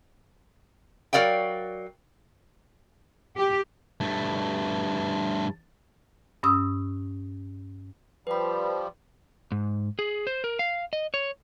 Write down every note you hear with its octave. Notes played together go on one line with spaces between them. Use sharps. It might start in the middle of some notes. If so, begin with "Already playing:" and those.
F#3 A#4 D5 F5 G5
G4
G2 A3
G2 C#4 D#6 E6
F3 G3 B4 B5
G#2
G#4
C5
A#4
F5
D#5
C#5